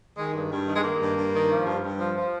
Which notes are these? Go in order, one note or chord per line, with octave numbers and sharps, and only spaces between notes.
D#3 G#3
G2
G2
D#3
G#3
D#3 A#3
G2
G2
D#3
F3
G2
G2
F3
F3